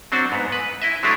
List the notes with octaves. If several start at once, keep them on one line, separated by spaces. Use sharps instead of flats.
F#3 C4 D4 F#4
G#2 B3
B4
E4 D#5 E5
F#3 G#3 A3 D4 E4 F4